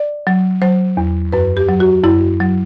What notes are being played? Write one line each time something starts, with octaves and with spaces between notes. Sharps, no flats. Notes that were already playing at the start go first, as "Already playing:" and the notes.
Already playing: D5
F#3
F#3 C5
E2
F#2 B4
G4
F#3
F#4
F#2 E4
F#3